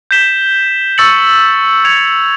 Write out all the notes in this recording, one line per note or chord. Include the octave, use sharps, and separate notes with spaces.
G6 B6 E7 G7
C#6 E6 A6 C#7 F#7
G#6 C#7 F7